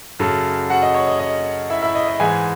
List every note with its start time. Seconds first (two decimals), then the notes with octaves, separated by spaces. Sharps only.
0.19 F#2 C#3 F#3 A4 A5
0.70 F#4 F#5
0.82 D#5
0.94 C#5
1.07 D#5
1.20 D#5
1.70 E4 E5
1.82 E4 E5
1.95 D#5
2.08 D#5
2.20 G#2 E3 G#3 G#4 G#5